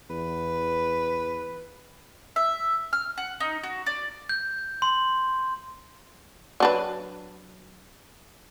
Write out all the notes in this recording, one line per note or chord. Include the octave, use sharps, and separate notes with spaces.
E2 B4
E5
F6
F#5
D#4
F#4
D5
G6
C6
F#3 D4 B4